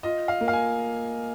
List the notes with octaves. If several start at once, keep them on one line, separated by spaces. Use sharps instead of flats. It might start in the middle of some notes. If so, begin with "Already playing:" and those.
F4 D#5
F5
A#3
F5
G#5